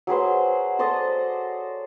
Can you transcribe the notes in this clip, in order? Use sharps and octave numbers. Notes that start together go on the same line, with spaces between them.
F#3 G#4 B4 C5
A4 C5 D5 D#5